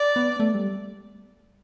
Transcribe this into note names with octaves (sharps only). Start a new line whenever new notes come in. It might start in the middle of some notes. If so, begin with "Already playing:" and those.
Already playing: D5
B3
A3
G3